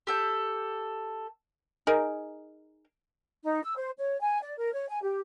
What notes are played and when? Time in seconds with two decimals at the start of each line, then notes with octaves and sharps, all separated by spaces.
0.07 G4 A4 G6
1.87 D#4 G#4 A#4
3.44 D#4
3.63 E6
3.77 C5
3.98 C#5
4.21 G#5
4.42 D5
4.57 A#4
4.74 C#5
4.89 G#5
5.02 G4